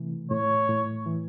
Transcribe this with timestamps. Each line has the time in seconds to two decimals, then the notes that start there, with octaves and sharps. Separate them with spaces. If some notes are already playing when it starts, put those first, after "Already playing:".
Already playing: C3 E3 A3
0.31 A2 C#5
0.69 A2
1.06 E3